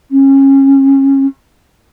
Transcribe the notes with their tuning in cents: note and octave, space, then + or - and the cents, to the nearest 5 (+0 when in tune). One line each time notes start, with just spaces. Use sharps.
C#4 -25